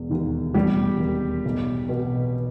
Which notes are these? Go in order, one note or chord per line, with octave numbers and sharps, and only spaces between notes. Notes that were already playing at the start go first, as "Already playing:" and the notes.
Already playing: E1
D#2 D#3
E1 G3 G4
D#2 D#3
B1
B2